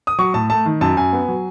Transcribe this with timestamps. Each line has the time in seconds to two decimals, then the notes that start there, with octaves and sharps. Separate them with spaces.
0.07 D#6
0.18 F#3 C#6
0.34 A2 A5
0.50 A3 A5
0.66 D#3
0.81 F#2 A5
0.97 F#2 G#5
1.13 B3
1.28 F#3